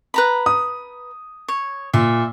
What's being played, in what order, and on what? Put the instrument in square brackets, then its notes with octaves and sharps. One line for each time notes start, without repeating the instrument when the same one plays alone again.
[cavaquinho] B4 A#5 B5
[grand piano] D#6
[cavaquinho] C#5
[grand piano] A#2 [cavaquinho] E5